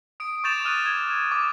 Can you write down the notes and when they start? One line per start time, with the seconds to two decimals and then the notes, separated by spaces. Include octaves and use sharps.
0.20 D#6 D7
0.44 C#6 D6 G6 A6 E7 F7
0.65 D6 D#6 F6 F#6 D#7 E7
0.86 G#6
1.32 D6